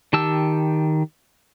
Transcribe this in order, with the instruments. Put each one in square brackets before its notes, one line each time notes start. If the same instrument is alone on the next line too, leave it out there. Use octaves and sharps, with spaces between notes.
[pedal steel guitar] D#3 G4 A5 E6